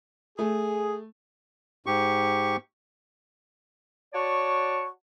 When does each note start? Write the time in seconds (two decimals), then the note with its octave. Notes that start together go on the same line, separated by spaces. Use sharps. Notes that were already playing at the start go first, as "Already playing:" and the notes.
0.39 A3 G#4
1.86 G#2 G4 C#6
4.14 F#4 C#5 D5 A5 C#6